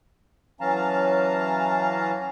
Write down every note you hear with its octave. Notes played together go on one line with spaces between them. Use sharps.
E3 F#3 C#4 F5 A5 A#5